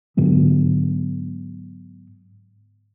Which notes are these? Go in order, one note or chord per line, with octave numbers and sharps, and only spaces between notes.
G#2 D3 F#3 B3